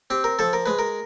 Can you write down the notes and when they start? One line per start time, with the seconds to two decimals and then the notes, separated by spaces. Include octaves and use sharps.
0.10 C4 G4
0.24 A#4
0.39 F3 A4
0.53 A#4
0.66 G#3 B4
0.79 A#4